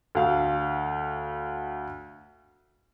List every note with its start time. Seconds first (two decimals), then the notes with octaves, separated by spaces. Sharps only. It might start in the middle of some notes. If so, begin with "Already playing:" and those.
0.15 D2 F5